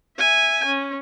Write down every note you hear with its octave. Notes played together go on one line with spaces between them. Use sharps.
E5 G#5
C#4